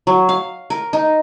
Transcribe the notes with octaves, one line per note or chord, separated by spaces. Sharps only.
F#3
F5
A#4
D#4